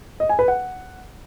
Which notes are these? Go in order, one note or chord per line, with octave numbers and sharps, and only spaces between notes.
D#5
G#5
B4
F#5